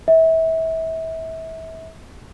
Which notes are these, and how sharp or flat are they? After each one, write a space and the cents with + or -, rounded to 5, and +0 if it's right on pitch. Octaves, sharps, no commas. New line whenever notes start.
E5 -30